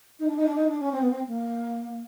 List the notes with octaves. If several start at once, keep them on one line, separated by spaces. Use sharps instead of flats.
D#4
D4
D#4
D4
D#4
D4
C#4
C4
B3
C4
A#3